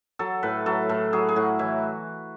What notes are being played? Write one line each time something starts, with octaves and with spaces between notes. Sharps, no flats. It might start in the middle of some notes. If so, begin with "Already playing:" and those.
F#3 A4
A2 B4
F#3 A4
A2 A4
F#3 G#4
G#4
A2 F#4
E3 E4